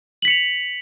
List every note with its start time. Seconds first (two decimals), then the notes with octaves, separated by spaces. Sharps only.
0.22 F#7
0.25 B6
0.28 C#7
0.30 F7